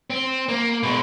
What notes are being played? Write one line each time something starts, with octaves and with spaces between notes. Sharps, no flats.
C4
A#3
B2 G#3